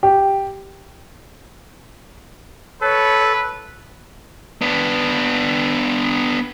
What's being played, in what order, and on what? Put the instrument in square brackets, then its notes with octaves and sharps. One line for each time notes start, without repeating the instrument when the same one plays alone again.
[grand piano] G4
[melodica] A4 [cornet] B4 [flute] C#5
[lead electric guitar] B3 D4